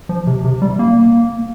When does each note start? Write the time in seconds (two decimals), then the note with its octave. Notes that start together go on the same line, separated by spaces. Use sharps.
0.09 F3
0.27 C3
0.44 C3
0.62 G3
0.79 A#3